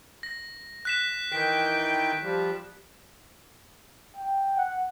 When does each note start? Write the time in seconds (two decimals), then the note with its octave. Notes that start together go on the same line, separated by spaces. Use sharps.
0.23 A#6
0.85 F#6 B6 E7
1.32 D#3 E3 G5 B6
2.23 F3 G3
4.17 G5
4.57 F#5